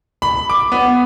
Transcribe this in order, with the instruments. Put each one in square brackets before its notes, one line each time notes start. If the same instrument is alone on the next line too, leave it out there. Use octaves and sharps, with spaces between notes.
[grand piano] B5
D6
B3